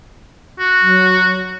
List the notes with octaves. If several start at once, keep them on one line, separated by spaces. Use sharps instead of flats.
F#4
F#3